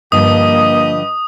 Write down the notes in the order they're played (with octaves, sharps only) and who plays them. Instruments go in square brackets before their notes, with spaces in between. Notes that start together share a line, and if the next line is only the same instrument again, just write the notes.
[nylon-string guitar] G2 D3 F3 [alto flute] A#3 [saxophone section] G4 B4 D#5 [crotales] D#6